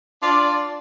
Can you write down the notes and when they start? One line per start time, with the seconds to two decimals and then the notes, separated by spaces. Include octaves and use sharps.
0.22 D4 F4 D5